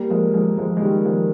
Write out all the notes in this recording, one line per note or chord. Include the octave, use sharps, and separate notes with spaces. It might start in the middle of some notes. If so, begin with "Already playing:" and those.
Already playing: G3 A#3
F3 G#3
F3 G#3
F3 G#3
G#3
D#3 G3
F3 G#3